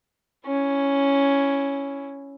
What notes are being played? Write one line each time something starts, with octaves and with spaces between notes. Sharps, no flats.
C#4 E4